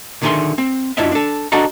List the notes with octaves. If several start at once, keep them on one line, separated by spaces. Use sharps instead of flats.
B1 D3 D#3 G#4 E5 C6
C4
F#2 D4 E4 F4 D#5 E5
D4 A4
D4 F#4 A4 D#5 F#5 A#5